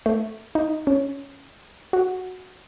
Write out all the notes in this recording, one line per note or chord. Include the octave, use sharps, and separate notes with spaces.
A3
D#4
C#4
F#4